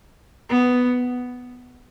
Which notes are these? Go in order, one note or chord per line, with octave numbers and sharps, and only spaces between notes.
B3